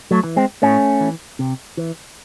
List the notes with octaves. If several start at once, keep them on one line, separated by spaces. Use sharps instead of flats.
F#3 A3
E3
G#3 C4
A2 A3 C#4
E3
C3
E3